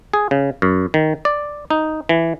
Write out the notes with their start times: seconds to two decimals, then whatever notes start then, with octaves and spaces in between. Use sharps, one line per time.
0.14 G#4
0.31 C#3
0.62 F#2
0.94 D#3
1.25 D5
1.70 D#4
2.09 E3